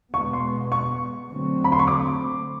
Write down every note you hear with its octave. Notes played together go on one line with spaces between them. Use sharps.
B2 G#3 B3 C#6
C6
C#6
D3 F#3 A3 C4
B5
C6
C#6
D6